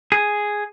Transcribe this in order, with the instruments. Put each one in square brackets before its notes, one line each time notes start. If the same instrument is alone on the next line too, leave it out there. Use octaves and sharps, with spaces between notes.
[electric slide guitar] G#4